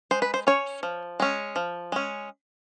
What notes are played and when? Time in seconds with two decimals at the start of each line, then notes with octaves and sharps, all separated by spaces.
0.11 G#3 C5
0.22 B4
0.34 C5
0.47 C#4 C#5
0.83 F3
1.20 G#3 C#4
1.56 F3
1.92 G#3 C#4